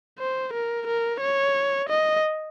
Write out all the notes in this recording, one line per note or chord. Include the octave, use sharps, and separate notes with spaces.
C5
A#4
A#4
C#5
D#5